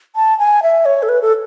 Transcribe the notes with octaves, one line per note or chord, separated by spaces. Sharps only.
A5
G#5
E5
C#5
A4
B4
A4